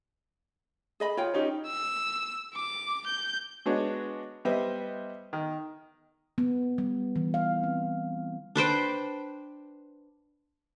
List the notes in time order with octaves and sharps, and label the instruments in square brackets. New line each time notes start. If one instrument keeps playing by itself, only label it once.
[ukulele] G#4 D#5 B5
[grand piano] F4 [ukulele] C#5 G5
[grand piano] C#4 D#4 G4
[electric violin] E6
D6
G6
[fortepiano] G#3 B3 D4 F#4 C#5 D#5
G3 B3 B4 C5 D#5 E5
D#3
[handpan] B3
G3
E3
F5
C4
[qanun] D4 B4 C5 G5